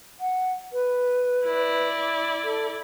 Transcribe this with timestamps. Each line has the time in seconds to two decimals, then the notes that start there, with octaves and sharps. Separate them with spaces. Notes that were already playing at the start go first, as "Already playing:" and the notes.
0.21 F#5
0.73 B4
1.46 E4 D5
2.44 A4